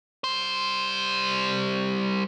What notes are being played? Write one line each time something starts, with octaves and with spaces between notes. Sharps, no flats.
G3 C5